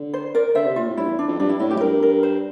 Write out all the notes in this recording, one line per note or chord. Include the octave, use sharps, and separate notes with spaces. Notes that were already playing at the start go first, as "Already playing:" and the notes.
Already playing: D3
C5
A#4 D5
D3 C5 E5
C3
A#2 F4
A2
G2 E4
E2
D4
F2
G2 D4
E4
A2 E4
G4
F2
G2 A#4
A#4
C5